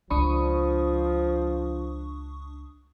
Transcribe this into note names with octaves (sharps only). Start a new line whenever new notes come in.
C#2 F3 D4 F4 B5 C#6 D#6